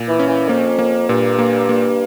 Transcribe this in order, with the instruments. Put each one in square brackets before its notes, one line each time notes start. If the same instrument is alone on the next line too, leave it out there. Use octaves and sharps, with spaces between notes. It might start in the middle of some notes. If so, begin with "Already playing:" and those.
Already playing: [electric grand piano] A#2
[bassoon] E3
[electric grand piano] C#4
[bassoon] E3
[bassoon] F2 [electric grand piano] A#3
[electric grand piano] A#3
[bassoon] G2 [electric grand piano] A#2
[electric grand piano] A#3
A#3